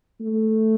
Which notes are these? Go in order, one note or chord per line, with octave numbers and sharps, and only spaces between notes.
A3